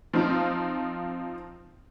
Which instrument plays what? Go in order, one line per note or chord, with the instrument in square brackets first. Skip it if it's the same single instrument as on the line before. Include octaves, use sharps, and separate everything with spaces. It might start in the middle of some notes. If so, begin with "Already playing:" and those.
[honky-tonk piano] F3 C4 D#4 F4